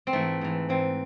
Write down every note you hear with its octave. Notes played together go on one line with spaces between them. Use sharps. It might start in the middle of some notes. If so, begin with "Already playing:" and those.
C4
G#2 E3 A3
G#2 E3
G#2 E3 C4